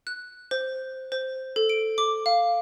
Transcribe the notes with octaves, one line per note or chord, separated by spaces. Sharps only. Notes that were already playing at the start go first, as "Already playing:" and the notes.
F#6
C5
C5
A4
D7
D6
F5